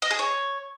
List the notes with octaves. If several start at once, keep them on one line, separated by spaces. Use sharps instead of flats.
D#5
G#4
C#5